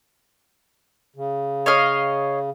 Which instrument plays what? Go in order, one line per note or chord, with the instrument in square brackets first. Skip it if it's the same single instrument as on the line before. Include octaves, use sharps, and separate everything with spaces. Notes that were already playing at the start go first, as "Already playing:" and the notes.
[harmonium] C#3
[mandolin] C#5 D#5 F5